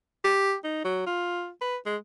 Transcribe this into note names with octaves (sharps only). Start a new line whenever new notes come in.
G4
D#4
F#3
F4
B4
G#3